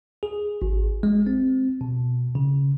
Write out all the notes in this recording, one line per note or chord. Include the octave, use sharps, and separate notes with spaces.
G#4
G#1
G#3
C4
B2
C#3